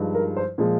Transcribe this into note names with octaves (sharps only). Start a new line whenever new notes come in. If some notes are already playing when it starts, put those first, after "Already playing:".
Already playing: G2 F3 G#3 D#4
A#4
C5
A#2 F3 G#3